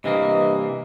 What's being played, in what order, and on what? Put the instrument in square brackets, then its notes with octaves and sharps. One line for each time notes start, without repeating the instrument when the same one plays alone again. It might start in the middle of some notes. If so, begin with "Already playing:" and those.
[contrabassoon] G2 [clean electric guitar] C3 E3 A#3 [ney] D#5